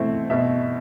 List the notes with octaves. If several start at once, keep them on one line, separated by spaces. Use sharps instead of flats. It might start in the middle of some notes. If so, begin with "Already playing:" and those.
Already playing: B2 A3 C4 E4
B2 E5